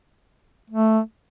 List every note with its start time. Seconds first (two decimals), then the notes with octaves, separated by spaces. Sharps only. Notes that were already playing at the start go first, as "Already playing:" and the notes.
0.70 A3